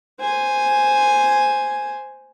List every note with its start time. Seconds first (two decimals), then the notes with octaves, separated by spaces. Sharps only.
0.19 C5 G#5